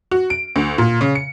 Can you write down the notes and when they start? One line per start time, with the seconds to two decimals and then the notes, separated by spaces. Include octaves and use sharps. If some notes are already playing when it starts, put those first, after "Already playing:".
0.11 F#4
0.30 D7
0.56 D2
0.78 A#2
1.01 C#3
1.15 C#7